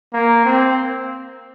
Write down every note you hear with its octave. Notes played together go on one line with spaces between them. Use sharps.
A#3
C4